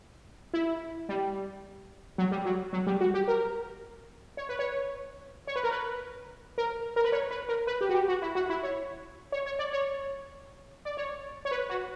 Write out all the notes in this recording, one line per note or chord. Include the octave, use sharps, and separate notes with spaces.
E4
G3
F#3
G3
F#3
F#3
G3
F#4
G4
A#4
C#5
B4
C#5
C#5
B4
A#4
B4
A#4
A#4
B4
C#5
B4
A#4
B4
G4
F#4
G4
F#4
E4
F#4
E4
C#5
C#5
C#5
D5
C#5
D5
C#5
C#5
B4
F#4